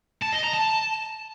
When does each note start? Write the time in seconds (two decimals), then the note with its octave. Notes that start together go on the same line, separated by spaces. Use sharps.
0.22 A5
0.32 D#5
0.43 A#5
0.53 A5